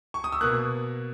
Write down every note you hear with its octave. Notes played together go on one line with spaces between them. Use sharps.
C#6
D#6
E6
B2 A#3 F#6